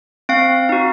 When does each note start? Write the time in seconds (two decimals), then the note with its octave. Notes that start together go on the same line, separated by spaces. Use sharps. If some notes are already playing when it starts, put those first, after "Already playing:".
0.29 C4 F5
0.69 D#4 F#4